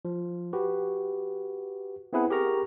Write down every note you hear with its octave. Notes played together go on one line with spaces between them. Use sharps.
F3
F#4 G4 B4
B3 C4 E4 G#4 B4 F#5
G4 G#4 A#4 A#5 C#6